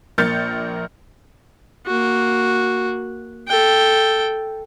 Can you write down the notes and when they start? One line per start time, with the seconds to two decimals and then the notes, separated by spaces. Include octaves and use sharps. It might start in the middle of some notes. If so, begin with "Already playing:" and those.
0.18 A#1 A#3 F6 G6 A6 C#7
1.86 A#3 F#4
3.48 A4 G5